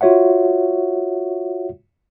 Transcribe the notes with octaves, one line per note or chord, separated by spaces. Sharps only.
F4 F#4 C#5 E5 F#5